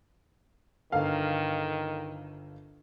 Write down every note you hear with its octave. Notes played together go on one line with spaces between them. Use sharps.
G1 D#3 A4 F5